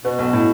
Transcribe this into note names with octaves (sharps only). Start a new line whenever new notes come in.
B2 B3
B1
A2